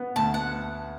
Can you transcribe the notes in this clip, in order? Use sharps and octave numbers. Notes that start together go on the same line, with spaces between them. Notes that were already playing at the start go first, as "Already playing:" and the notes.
Already playing: B3
D2 A5
F#5